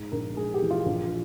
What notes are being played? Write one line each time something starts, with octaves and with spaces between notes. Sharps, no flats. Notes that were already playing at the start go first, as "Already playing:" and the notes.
Already playing: G#2
A#1 A#4
G#3 G#4
G4
E3
F4
A#1 F4